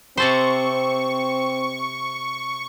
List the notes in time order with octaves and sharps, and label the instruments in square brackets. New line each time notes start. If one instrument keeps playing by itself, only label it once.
[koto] C3 A4 C5 [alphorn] C4 [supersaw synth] C#6